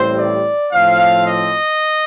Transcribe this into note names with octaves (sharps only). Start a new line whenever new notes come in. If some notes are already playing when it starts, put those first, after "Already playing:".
Already playing: A1 A2 G3 C4 C5
D5
A2 F3 C4 F5
D#5